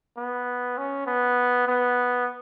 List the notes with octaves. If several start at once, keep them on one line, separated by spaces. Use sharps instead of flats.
B3
C#4
B3
B3